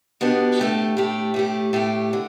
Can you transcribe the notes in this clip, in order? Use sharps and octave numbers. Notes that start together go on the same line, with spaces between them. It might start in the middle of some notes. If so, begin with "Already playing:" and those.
B2 B3 D4 G4
A2 A3 G4
A2 A3 G4
A2 A3 G4
A2 A3 G4
D3